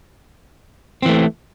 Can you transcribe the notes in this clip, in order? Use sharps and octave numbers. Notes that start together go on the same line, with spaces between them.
E3 A3 C4